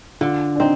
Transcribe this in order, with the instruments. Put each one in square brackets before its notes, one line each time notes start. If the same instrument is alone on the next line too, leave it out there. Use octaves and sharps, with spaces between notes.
[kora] D3 [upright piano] F4
[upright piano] D4
[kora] C4 [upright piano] D#4